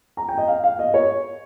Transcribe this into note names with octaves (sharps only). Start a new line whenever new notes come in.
A#5
G5
D#5
F5
F5
D#5
C#5